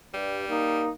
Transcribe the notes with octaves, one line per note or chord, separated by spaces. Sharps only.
G2 G3
A#3 D#4